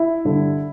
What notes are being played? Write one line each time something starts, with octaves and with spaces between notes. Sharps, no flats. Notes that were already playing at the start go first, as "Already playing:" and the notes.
Already playing: E4
G2 D3